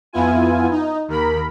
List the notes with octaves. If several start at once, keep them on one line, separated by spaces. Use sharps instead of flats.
F2 B3 E4 F4 G#5
D#4
D#2 A#4 B5